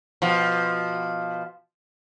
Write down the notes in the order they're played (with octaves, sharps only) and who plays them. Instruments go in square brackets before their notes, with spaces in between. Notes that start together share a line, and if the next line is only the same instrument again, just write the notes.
[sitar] B2 F3